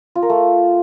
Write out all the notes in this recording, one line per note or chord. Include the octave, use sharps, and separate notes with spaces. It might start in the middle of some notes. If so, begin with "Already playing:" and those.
F4
A#4
A3